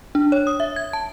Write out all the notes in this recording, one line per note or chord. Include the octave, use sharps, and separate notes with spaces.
D4
C#5
D#6
E5
G#6
A5